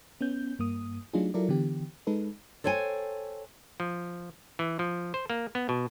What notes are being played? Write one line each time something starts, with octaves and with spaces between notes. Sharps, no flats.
B3 C#4 G6
G2 A#3 D#6
F#3 A3 D4 D#4 F4 G#4
F#3 E4 F4 A4 A#4 D5
D3 E3 B3 G4
G#3 D#4 A4 B4
A4 C5 C#5 G5 G#5
F3
E3
F3
C5
A#3
B3
B2